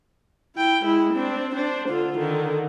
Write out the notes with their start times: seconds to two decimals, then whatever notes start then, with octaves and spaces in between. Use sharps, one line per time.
0.55 E4 G5
0.84 G#3 E4
1.14 C4 D4
1.55 D4 C5
1.88 D3 F4
2.18 D3 D#3